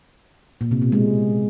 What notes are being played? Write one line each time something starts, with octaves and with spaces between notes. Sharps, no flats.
A#2
C3
B2
G#3